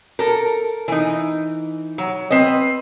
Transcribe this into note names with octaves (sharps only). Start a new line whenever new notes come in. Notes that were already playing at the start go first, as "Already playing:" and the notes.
A4 A#4
E3 D#4
F#3
C4 B4 D#5